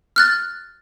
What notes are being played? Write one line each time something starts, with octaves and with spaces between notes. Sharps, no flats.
F6 F#6 A6